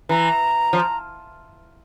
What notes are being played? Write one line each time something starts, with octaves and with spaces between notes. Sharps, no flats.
E3 A#5
F3